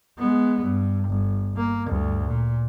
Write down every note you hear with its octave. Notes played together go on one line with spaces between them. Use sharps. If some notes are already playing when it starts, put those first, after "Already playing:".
G#3 B3
G2
G1
A#3
D2 G2
A#2